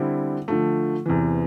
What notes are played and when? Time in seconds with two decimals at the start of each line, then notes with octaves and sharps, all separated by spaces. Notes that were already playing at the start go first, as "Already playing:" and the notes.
Already playing: D3 G3 C4 E4
0.48 D3 F3 A3
1.06 E2 C3 E3